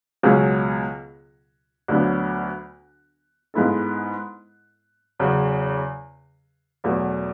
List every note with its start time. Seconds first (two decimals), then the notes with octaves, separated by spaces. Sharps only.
0.23 C#2 B2 F#3 C#4 G#4
1.88 D2 D3 F#3 B3 D4
3.54 G#2 G#3 B3 E4 A4
5.19 E2 C#3 F#3
6.84 E2 B2 F#3 A3